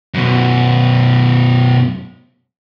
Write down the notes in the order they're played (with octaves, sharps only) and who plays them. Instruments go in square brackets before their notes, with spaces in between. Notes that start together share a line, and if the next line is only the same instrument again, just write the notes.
[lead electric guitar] F#2 B2